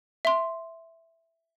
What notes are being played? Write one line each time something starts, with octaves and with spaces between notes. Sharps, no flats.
E5 C6